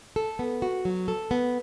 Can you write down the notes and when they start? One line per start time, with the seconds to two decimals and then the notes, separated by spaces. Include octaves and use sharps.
0.16 A4
0.39 B3
0.62 F#4
0.85 F#3
1.08 A4
1.31 B3